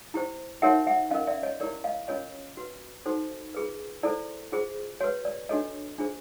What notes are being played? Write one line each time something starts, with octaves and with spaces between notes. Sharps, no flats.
E4 G4 C5
D#4 F#4 A#4 C#5 E5 F#5
E5 F#5
C#4 F4 A#4 D#5 F5
D5 E5
C#5 D#5
E4 G4 A#4 C#5 D5
D#5 F5
C#4 F4 A#4 C#5 D#5
F#4 B4
D#4 F#4 A4 C5
F4 G#4 B4
E4 A4 C5 D5
F4 G#4 C5
F#4 B4 C#5
D5
D4 F#4 A4 C#5 D#5
D4 F4 G#4 C5